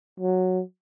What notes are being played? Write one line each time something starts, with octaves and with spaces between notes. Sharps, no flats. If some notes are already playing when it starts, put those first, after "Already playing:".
F#3